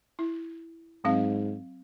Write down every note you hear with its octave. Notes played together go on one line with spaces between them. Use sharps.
E4
G#2 F#3 C4 F5